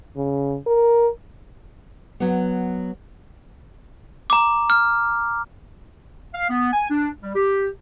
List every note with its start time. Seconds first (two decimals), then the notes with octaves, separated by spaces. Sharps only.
0.16 C#3
0.67 A#4
2.20 F#3 B3
4.30 A#5 D6
4.70 F6
6.34 F5
6.49 B3
6.73 G#5
6.90 D4
7.21 G3
7.35 G4